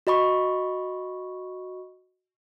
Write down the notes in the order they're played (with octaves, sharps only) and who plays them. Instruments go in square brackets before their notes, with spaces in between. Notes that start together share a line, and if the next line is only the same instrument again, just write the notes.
[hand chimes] F#4 D#5 B5 C#6